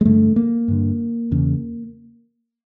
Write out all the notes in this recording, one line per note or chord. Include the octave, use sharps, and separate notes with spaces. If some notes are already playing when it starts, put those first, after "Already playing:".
G#3
G2 D3 A3
A#3
G2 D3
E2 C#3